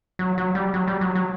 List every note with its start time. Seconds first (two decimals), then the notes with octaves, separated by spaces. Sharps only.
0.19 F#3
0.38 F#3
0.55 G3
0.74 F#3
0.88 G3
1.01 F#3
1.15 F#3